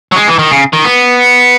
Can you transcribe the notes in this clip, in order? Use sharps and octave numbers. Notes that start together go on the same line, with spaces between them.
F#3
G#3
E3
D#3
C#3
D#3
B3